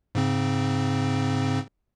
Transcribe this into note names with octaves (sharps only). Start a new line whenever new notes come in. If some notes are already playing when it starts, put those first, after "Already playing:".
G#2 C#3 C4